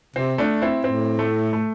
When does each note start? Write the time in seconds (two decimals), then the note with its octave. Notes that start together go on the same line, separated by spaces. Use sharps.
0.16 C3 C4
0.38 A3 D4
0.61 C4 E4
0.84 A2 C4
1.19 A3
1.53 A3